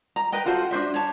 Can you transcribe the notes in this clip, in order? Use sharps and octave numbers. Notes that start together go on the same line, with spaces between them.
A#5
B4 D#5 G5
F4 F#4 A4 C5
D4 F#4 C5 E5
C#5 A5